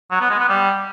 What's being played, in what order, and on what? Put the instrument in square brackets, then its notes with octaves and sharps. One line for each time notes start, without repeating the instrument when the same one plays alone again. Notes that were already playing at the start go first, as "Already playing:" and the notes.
[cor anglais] F#3
B3
G#3
B3
G3